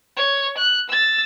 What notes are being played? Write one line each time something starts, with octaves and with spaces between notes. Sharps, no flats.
C#5
F#6
E6 A6